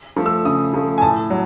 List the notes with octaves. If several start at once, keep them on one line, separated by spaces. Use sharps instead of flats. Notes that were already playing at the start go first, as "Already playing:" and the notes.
F3 A3
E6
C#3 D#6
F3 A3
G#5
A2 A5
F#3